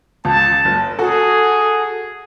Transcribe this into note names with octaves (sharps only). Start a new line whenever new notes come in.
C#2 A5
F#1
F#4 G#4 A4